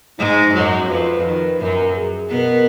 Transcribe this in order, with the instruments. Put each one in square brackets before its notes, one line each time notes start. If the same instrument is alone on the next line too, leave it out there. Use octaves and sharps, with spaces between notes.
[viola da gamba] G#2 G#3 [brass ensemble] D#4
[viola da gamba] F#2 F#3 [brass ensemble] F#4
[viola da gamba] F2 F3 [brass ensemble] B4
[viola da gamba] D#3
[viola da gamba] F#2 F#3 [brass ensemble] A#4
[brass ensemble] G#4
[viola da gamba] B2 B3 [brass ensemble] A#4